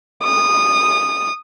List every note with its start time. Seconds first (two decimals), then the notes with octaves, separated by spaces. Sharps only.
0.24 D#6